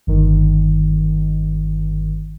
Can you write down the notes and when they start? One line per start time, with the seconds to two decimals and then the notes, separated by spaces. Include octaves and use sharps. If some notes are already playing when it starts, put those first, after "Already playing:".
0.07 G1 D#3